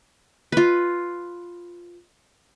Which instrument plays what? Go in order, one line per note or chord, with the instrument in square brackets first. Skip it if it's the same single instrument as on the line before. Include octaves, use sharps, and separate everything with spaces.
[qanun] F4 B4